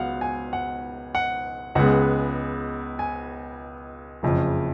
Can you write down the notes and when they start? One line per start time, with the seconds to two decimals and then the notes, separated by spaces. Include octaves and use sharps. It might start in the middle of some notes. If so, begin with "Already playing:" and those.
Already playing: C#2 F#3 B3 F5 F#5
0.21 G#5
0.53 F#5
1.15 F#5
1.75 C#2 C#3 G#3 B3 F#5
2.99 G#5
4.23 F#1 F2 C#3